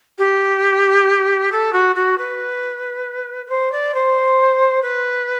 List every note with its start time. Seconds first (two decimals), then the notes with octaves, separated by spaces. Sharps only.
0.19 G4
1.52 A4
1.73 F#4
1.95 F#4
2.18 B4
3.46 B4
3.49 C5
3.72 D5
3.94 C5
4.82 B4